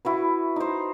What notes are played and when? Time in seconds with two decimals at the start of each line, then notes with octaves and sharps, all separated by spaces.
0.05 E4 F#4 B4
0.56 D#4 C5